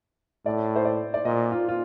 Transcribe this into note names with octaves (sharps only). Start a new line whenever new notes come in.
A2 D5
C5
D5
D5
A#2 D#5
F4
F4